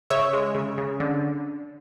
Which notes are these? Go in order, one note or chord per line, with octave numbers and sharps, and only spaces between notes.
C#3 C#5 E5
G#3
C#3
C#3
D3